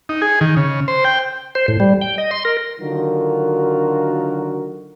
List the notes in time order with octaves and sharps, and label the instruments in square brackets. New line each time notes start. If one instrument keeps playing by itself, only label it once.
[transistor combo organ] D#4
G#4
D#3
C#3
C5
G5
[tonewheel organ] C5
A2
G3
G5
D#5
C6
A#4
[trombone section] D3 D#3 F#3 F4 F#4 A#4